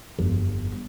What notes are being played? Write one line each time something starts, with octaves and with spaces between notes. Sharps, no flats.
G1 F2